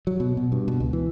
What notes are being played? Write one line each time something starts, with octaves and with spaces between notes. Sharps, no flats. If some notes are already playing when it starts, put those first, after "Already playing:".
F#3
B2
B2
G2
B2
C#2
E3